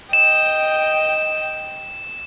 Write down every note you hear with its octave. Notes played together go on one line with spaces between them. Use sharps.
D#5 G5 E7